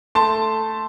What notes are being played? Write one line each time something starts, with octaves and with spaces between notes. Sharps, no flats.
A3 A5 C6